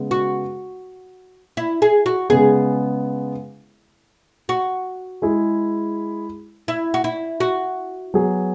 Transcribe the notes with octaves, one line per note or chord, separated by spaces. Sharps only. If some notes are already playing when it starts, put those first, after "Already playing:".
Already playing: C#3 G#3 B3
F#4
E4
G#4
F#4
C#3 G#3 B3 G#4
F#4
G#3 E4 G#4
E4
F#4
E4
F#4
F#3 B3 G#4